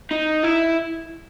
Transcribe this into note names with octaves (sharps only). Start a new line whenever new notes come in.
D#4
E4